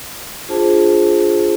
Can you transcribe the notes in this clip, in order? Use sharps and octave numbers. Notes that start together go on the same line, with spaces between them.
D4 F4 G#4 C5 A5